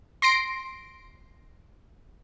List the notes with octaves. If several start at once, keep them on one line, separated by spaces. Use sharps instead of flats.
C6 A#6 C7 D7